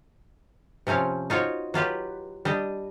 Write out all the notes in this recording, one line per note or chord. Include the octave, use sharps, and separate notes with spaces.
C3 F3 C4 C#4 F5
D#4 F4 F#4 C5 C#5
F#3 F4 G4 B4
G3 D4 D#5